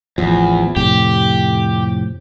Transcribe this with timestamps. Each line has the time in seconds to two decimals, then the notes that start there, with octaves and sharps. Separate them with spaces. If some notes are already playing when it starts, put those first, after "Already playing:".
0.18 A1 E2 F3
0.76 F2 A2 C3 G4